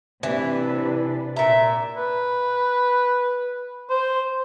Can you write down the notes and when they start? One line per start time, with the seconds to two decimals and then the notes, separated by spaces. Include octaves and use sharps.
0.23 C3 E3 D4 B4
1.36 A#2 E5 A#5
1.97 B4
3.90 C5